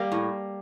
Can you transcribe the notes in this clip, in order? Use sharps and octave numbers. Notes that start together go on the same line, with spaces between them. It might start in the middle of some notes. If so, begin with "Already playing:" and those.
Already playing: G3 A#3
A2